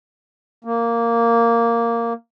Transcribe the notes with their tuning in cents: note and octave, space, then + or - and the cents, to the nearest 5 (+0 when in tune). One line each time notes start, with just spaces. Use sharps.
A#3 -5